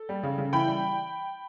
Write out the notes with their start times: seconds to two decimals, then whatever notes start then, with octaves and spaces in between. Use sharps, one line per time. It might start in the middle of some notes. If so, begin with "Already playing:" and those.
Already playing: A4
0.09 G3
0.23 C#3
0.38 C#3
0.53 E3 G5 B5
0.67 G3